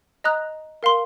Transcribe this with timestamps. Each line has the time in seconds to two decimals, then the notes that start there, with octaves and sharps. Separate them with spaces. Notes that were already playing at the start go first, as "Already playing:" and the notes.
0.24 D#5 A#5 D#6 F#6
0.83 A#4 F5 C6